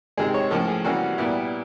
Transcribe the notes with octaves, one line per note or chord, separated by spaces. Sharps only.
C3 D#3 G#3 G#4
C#5
A2 F3 A#3 C#4 A4
G#4
C3 E3 G3 A#3 C#4 F#4
A#2 G3 B3 E4